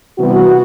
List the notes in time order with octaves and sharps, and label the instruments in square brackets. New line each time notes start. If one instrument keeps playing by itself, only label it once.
[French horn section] C3 E3 G3 B3 F#4